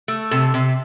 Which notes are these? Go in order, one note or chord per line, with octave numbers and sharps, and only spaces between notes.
A3
C3 A4
C3